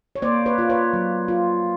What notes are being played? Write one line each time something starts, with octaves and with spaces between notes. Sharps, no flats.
C#5
A#3 C5 D5
B4 C#5
F4
B4 C#5
F#3
F4